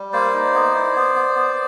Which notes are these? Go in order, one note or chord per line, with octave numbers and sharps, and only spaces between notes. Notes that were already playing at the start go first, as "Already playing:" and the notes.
Already playing: G3
A#3 C5 D5
D#4
B3
E4
B3
B3
B3